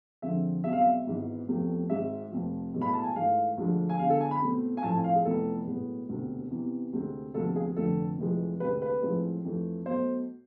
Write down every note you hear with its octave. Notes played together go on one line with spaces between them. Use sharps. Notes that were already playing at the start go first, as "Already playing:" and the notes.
F2 D3 F3 G#3 C4 E5
B1 B2 G#3 C4 E5
F5
E5
G#1 G#2 E3 B3
F1 E2 C3 F3 A3
G#1 G#2 G#3 C4 E5
F1 F2 C3 F3
B1 A2 E3 G#3
B5
A5
G#5
G#2 E3 A3 F5
D2 D3 F3 G#3
G#5
E2 D3 G#3 F5
A4
G#5
B5
E1 E2 B2 A3 C4
G#5
A1 A2 F3 A3 C4 A5
G#5
F5
G#4
F1 F2 E3 B3 A4
B1 A2 G#3 B3
E1 D2 C3
E2 C3 E3
D2 C3 G#3 C4
D2 C3 F3 G#3 B3 A4
G#4
F1 F2 D3 A3 A4
F1 F2 E3 G#3
D2 C3 G#3 C4 B4
B4
A1 A2 F3 G#3 C4
F2 E3 A3
B1 B2 A3 C5